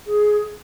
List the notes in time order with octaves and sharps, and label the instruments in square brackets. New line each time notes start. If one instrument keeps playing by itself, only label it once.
[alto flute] G#4